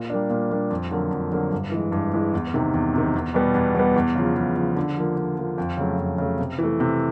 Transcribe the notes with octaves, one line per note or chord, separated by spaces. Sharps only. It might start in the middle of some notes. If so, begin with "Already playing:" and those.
Already playing: A#2
G3 A#3 D4
A#2
G3 A#3 D4
F2
D3 F#3 A#3
F2
D3 F#3 A#3
G2
E3 G#3
G2
E3 G#3
E2
C3 D#3
E2
C3 D#3
E2
B2 G3 B3
E2
B2 G3 B3
E2
C#3 F3
E2
C#3 F3
D3
F3 A#3
D3
F3 A#3
F2
C#3 F#3 A3
F2
C#3 F#3 A3
C3
E3 A3
C3